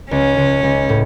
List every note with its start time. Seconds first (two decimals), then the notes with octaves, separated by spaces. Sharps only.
0.10 C#2 C#4
0.37 C#2
0.63 C#2
0.89 A2